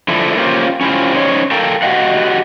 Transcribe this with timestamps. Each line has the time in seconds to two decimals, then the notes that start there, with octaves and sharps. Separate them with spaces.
0.08 D3 F3 E4 A4
0.37 A#3 C#4 F4 G4 C5
0.81 C#4 E4 F4 G4 C5
1.14 C#4 D#4 C5 C#5
1.51 A4 A#4 F5 G5 A5
1.82 F#4 G4 D#5 F5 F#5